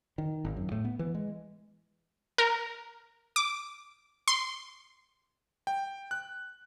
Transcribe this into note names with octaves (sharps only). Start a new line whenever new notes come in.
D#3
G#1
F#2
A2
B3
E3
G#3
A#4
D6
C6
G5
F#6